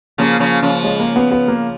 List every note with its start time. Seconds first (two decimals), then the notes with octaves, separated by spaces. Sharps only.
0.18 C#3 F3 A#3
0.39 C#3 F3
0.62 C#3 F3
0.83 G#3
1.00 A#3
1.16 B3
1.31 B3
1.48 A#3